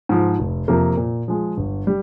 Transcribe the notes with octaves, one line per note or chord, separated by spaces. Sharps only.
G#2 F3
F1
F2 C3 F3 A#3
A#2
F3 G#3
G1
G3